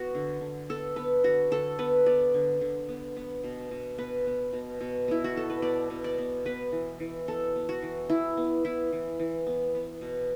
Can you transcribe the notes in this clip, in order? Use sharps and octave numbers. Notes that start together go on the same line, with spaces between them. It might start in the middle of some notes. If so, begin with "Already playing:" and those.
Already playing: B3 F#4
D3
D3
B3 A4
B3 B4
D3 F#4
D3 A4
B3 B4
B3 D5
D3
D3
B3
B3
B2
B2
B3 B4
B3
B2
B2
B3 E4
F#4
B3 A4
B4
B2 D5
B2
D5
B3
B3 B4
E3
E3
B3 A4
B3
F#4
E3
E3 E4
B3
B3 E4
E3
E3
B3
B3
B2